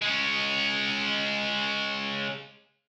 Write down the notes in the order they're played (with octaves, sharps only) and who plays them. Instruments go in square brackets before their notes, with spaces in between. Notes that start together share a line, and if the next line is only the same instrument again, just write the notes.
[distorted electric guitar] G#3 C#4